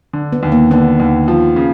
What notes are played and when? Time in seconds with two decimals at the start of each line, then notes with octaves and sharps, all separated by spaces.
0.13 D3
0.33 B3
0.43 D#2
0.52 A#3
0.71 D3 B3
1.00 D#2
1.28 F3
1.56 C#3